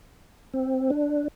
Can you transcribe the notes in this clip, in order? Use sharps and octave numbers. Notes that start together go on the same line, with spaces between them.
C4
D4